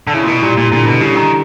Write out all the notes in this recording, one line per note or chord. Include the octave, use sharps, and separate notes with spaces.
D3
C#3 E4
A#2
B2
A#2 G3
A#2
A#2 D3
B2
C#3 G3
D#3